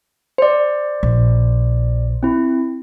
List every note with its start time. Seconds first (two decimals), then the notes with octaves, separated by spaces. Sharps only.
0.38 C5 D5
1.03 A#1
2.23 C4 E4